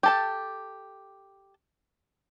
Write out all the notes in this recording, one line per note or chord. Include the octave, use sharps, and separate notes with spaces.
G4 A4 A5